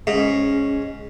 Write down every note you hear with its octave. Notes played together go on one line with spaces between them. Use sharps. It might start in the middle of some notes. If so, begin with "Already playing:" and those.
G#2 C#4